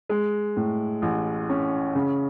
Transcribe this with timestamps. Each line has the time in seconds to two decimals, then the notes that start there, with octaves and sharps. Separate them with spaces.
0.09 G#3
0.56 A2
1.02 A1
1.49 C#4
1.95 C#3